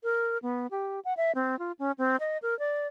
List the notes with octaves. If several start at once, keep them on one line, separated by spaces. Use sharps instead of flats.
A#4
B3
G4
F#5
E5
C4
F4
C#4
C4
D#5
A#4
D5